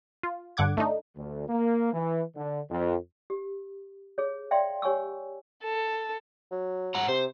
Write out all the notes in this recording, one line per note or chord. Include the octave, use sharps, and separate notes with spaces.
F4
G2 D3 F#5 D6 G#6
A3 D4 D#4
D2
A#3
E3
D3
F2
G4
G#4 C#5
D5 E5 F5 G5 C6
G4 C#5 G#5 C#6 E6
A4
F#3
G#2 F#5 A#5
C3 C5